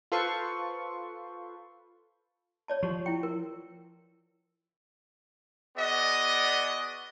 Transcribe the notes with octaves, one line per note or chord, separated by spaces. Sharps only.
F4 A4 B4 C5 C6 C#6
C#5 D5 A5
F3 G4
E4 G5
A#4
B3 F#4 G#4 D5 D#5